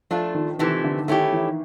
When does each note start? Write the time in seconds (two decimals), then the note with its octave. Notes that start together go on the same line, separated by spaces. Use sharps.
0.11 F3 A3 D4 F4
0.35 D#3
0.59 C3 D#3 E3 A3
0.84 D3
1.08 D#3 A3 C#4 E4 G4
1.32 E3